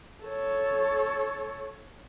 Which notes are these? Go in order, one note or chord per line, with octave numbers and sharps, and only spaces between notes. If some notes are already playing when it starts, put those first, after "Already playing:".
A4 C#5